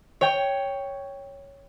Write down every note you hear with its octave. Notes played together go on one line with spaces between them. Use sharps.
C#5 G5